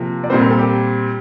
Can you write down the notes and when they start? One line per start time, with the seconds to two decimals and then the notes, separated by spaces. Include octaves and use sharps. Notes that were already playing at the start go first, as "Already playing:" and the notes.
Already playing: C3 F3 A#3
0.24 D5
0.30 A#2 G3 C4 C5
0.40 A#4
0.50 A4
0.59 G4